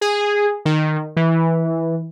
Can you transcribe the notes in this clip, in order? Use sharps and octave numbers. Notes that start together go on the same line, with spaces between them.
G#4
D#3
E3